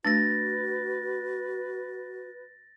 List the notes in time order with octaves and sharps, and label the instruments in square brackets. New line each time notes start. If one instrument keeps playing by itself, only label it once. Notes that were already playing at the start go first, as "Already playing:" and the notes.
[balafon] A3 D4 [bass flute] F#4 [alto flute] B4 [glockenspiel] A6 A#6